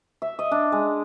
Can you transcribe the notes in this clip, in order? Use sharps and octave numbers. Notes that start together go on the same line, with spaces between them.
E5
D#5
D4
G#3